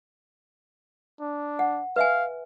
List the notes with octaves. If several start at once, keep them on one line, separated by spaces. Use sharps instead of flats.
D4
F#5
B4 E5 F5 G#5